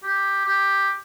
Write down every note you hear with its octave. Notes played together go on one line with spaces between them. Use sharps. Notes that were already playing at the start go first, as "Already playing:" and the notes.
G4
G4